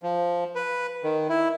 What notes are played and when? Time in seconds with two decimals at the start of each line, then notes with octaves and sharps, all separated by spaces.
0.03 F3
0.55 B4
1.03 D#3
1.29 E4